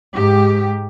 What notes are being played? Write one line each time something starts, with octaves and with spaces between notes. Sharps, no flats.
G#2 G4